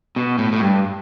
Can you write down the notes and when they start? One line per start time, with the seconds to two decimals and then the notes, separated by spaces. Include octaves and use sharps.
0.16 B2
0.38 A2
0.52 A2
0.60 G2